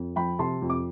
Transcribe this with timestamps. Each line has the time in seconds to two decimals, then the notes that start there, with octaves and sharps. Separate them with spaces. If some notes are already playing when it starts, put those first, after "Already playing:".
Already playing: F2
0.16 F3 G5 B5
0.39 C3 A5 C6
0.62 F2
0.70 D6